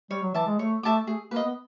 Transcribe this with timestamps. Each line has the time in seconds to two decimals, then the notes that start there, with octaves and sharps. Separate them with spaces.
0.10 G3 C#5
0.22 F#3
0.34 E3 E5 A5 D6
0.47 G#3
0.59 A3 C#5
0.83 A3 E5 A5 D6
1.07 A3 G#4
1.31 A#3 B4
1.36 D#5
1.44 B3